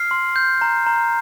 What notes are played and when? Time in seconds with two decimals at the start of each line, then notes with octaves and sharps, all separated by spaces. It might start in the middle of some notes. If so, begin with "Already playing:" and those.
Already playing: F6 C7
0.11 C6
0.36 G6
0.61 A#5
0.86 A#5